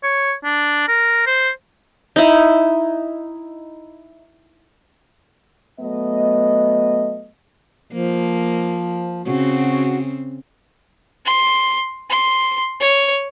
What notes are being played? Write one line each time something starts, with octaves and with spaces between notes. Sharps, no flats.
C#5
D4
A#4
C5
D#4 E4
F#3 A3 B3 D#5
F3 A#3
C#3 C4 F#4
C6
C6
C#5